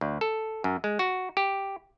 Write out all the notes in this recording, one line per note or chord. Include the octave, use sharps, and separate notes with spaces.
D2
A4
F#2
G#3
F#4
G4